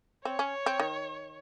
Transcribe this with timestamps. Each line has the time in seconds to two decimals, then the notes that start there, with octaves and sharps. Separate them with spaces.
0.25 C4 C#5
0.39 C#4
0.66 C4
0.80 D#3